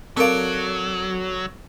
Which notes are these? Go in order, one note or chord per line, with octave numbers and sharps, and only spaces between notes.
F#3 C4 A4 A#4 D5 F5